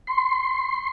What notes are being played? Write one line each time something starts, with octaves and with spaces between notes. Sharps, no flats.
C6